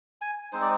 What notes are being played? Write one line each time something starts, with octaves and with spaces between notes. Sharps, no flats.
G#5
G#3 C4 D#4 C5
D5